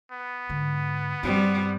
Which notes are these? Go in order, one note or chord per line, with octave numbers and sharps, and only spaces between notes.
B3
G#2 D3
G2 G3 C4